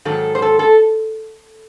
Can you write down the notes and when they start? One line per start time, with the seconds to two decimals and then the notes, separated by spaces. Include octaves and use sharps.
0.05 G#2 D#3 F#3 A4
0.35 C5
0.42 A4
0.59 A4